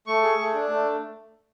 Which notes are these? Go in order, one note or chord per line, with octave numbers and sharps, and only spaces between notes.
A3 C#6
G#4
A3
D4
A3